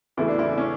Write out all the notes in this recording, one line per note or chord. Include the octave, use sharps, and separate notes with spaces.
E2 C#3 E3 A3 E4
D4
E4
C#4